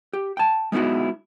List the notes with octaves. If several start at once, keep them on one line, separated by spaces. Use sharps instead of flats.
G4
G5 A5
G#3 B3 D#4 E4 F#4